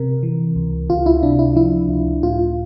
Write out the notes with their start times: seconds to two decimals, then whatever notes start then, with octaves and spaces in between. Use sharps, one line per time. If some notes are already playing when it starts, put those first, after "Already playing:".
Already playing: C3 A#4
0.23 E3
0.56 C#2
0.89 C#2 F4
1.06 E4
1.22 C3 D4
1.39 E4
1.56 F3 E4
1.89 C#2
2.23 A2 F4